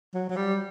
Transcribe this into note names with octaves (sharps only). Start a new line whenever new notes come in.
F#3
F#3
G3